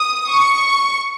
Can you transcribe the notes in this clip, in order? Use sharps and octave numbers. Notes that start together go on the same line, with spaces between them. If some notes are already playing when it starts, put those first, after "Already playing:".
Already playing: D#6
C#6